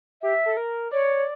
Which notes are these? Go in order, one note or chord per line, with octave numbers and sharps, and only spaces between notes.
G4 E5
A4
A#4
C#5 D5